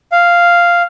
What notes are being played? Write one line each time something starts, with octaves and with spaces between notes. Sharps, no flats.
F5